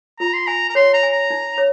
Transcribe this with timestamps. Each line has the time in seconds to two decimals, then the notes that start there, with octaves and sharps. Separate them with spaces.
0.19 F4 A#5
0.34 C6
0.47 G#5 A#5
0.70 A#5
0.75 C#5 C6
0.94 A#5
1.03 G#5
1.12 A#5
1.30 D#4
1.58 C#5